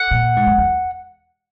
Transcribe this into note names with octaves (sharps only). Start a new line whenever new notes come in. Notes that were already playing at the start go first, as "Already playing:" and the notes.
Already playing: F#5
A#2
G#2
F#2
E2